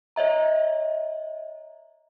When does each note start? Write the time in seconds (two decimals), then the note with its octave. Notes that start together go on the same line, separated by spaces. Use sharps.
0.16 C#5 D#5 E5 A#5